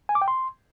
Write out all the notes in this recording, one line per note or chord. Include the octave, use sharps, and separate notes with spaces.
G#5
D6
G5
C6